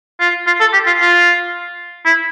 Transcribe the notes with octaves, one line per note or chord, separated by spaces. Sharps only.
F4
F4
A4
G4
F4
F4
E4